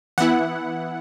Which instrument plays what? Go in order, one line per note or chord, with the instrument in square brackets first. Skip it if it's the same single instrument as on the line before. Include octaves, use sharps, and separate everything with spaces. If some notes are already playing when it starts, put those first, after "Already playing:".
[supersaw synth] E3 B3 E4 F#5